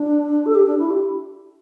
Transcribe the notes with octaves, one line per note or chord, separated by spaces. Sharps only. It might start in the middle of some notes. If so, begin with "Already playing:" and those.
Already playing: D4
A4
G4
D4
E4
G4